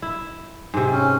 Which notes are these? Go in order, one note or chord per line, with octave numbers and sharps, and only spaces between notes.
E4
G#2 C3
C#4